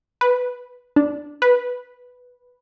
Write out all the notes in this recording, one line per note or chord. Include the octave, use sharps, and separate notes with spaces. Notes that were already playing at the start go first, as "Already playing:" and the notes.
B4
D4
B4